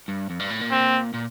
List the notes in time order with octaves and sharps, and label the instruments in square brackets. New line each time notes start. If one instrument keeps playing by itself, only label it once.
[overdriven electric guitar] G2
F2
G2
A2
A#2
[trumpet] C4
[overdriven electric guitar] A#2